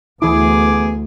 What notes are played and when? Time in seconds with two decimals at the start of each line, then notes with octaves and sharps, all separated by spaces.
0.22 D2 E3 B3 E4 G#4 D6